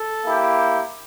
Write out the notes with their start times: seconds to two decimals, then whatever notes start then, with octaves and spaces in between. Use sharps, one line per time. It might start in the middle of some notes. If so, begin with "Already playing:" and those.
Already playing: A4
0.25 A#3 E4 G4